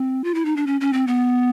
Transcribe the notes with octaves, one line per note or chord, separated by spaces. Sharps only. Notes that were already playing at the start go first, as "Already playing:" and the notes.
Already playing: C4
F4
E4
D#4
D4
C#4
C#4
C4
B3